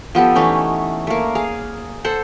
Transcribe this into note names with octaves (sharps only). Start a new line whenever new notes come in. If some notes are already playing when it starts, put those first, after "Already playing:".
F3 B3 G4 A4
E3 A3 C#4 D#4
A3 A#3
G#4 F5
A4 C5 F#5